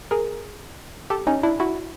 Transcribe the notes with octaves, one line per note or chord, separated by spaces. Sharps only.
G#4 A#4
G4 A4
C#4 D#4
D4 E4
E4 F#4